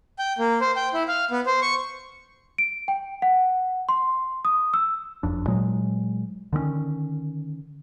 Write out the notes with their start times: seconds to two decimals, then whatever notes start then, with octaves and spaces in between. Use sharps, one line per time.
0.19 G5
0.38 A#3
0.61 C5
0.76 G5
0.94 E4
1.08 F5
1.31 B3
1.46 C5
1.62 C#6
2.58 D7
2.88 G5
3.22 F#5
3.89 C6
4.45 D#6
4.74 E6
5.23 F#1 F2 D4
5.47 A#2 F#3 G#3
6.53 D3 D#3 A3 C#4